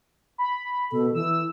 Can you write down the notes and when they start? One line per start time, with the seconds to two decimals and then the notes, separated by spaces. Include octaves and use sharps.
0.38 B5
0.92 B2 A4
1.14 E3 E6